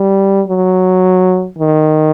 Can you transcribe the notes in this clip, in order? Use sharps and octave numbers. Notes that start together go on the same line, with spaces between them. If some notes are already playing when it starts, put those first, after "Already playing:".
Already playing: G3
F#3
D#3